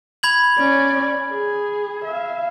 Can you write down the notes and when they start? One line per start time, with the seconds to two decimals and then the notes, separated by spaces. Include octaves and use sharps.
0.23 B5 G#6 F#7
0.58 C#4 D5
1.29 G#4
2.04 E5 F5